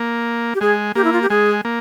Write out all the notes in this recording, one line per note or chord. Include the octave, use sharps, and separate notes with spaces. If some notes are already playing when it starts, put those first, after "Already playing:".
Already playing: A#3
G4
G#3 G#4
A#3 G4
E4
F4
G4
G#3 G#4
A#3